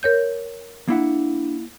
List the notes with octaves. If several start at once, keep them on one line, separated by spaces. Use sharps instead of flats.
A#4 C#5 G6
A#3 D4 E4 F#5